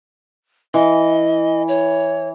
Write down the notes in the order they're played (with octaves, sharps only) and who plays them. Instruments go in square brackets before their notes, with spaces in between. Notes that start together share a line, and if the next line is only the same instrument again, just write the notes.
[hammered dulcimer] E3 [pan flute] D#5
[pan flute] C#5